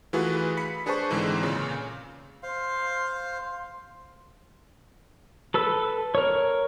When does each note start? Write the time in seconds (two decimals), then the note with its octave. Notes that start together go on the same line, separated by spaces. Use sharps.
0.13 E3 A3 F4 F#4 G#4 B4
0.57 B5 B6 C#7
0.86 D4 G#4 B4 C5 A5 C#6
1.11 G#2 D3 E3 G#3 C4
1.43 A#2 C#3
2.43 C5 F5 C6
5.54 A4 B4 E6
6.15 A#4 C#5